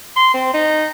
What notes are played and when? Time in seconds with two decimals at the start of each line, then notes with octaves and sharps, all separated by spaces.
0.16 C6
0.34 C4
0.54 D#4